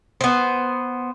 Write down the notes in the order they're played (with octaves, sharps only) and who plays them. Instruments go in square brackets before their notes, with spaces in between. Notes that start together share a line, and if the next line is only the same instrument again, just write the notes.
[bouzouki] B3 C5